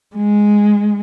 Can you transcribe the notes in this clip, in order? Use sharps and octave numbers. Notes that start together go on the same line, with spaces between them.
G#3